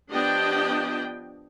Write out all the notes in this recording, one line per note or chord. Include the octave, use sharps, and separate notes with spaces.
F3 B3 D4 G4 D#5 G5